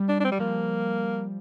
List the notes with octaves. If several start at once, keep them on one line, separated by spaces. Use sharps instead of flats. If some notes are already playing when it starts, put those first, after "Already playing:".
Already playing: G3
D4
D4
C4
G3
F3 A#3